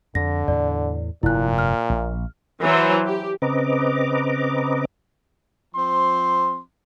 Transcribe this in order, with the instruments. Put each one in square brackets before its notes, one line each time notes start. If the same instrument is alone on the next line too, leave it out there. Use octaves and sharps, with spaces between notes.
[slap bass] F2 [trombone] D3 [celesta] A#6
[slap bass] E2 A2 [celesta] D5
[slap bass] F1 G2 [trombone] A#2 [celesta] E4 F#6
[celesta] F6
[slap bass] A#1
[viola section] E3 F#3 C5
G4
[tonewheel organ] C#3 C4 B4 D#5 A#5 D6
[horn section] F3 C4 C6